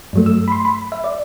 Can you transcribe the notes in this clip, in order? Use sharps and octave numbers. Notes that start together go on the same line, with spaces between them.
G2 F#3 A3
E6
B5
C6
B5
E5
D5